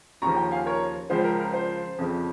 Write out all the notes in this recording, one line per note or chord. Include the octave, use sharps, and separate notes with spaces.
D#2 C#3 F3 A#5 C#6
G5 A#5
F5 G#5
A#4 C#5
C#2 C#3 F3 C5
A#4
A#4
C5
F2 C#3 F3